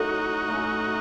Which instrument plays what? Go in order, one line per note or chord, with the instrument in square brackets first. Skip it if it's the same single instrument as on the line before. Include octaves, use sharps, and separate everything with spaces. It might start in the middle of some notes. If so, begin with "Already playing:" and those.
Already playing: [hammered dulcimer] A2 F#3 A3 C#4 [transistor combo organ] D#4 F#4
[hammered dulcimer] A2 F#3 A3 C#4